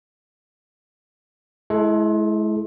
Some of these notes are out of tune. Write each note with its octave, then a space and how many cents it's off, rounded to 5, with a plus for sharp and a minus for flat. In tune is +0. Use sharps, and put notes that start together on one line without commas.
G#3 +35 E4 +0 A4 +0